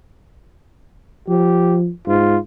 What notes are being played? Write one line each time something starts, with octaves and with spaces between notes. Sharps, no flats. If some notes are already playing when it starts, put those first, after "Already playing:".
F3 G4
G#2 F4